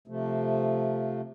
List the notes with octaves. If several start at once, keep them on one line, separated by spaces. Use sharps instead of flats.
C3 F3 A3